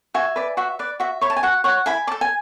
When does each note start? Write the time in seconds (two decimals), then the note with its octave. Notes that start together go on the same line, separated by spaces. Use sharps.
0.14 F#4 E5 G#5
0.36 B4 D5
0.57 F#4 E5
0.79 B4 D5
1.00 F#4 E5
1.21 C#5 B5
1.30 A5
1.37 G#5
1.43 F#4 F#5
1.64 C#5 F#5
1.86 E4 G#5 B5
2.07 A4 D5 A5
2.21 G#5